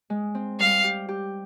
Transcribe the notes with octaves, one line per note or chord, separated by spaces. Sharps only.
G#3
C4
G3 F5
G4
G4